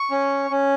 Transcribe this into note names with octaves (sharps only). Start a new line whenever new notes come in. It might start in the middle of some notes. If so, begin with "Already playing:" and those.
Already playing: C#6
C#4
C#4